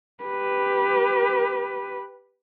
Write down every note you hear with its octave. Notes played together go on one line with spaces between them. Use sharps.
G4 B4